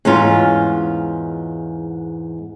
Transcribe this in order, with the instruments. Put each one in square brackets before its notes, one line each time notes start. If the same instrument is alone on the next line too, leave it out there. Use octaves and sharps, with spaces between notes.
[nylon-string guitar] E2 G#2 C#4 F4